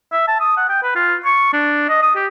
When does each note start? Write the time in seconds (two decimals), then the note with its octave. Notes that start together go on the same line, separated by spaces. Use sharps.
0.12 E5
0.28 A5
0.40 D#6
0.57 F#5
0.69 G5
0.83 B4
0.95 F4
1.25 C#6
1.53 D4
1.89 D#5
2.02 D#6
2.15 G4